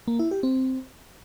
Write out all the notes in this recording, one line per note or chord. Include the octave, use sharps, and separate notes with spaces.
A#3
E4
G4
C4